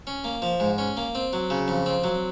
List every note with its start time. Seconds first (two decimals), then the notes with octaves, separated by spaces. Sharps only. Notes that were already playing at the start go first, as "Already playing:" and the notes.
0.07 C#4
0.24 A#3
0.42 F3
0.60 G#2
0.78 C#4
0.97 A#3
1.15 C4
1.33 F#3
1.50 C#3
1.68 F2
1.86 C4
2.04 F#3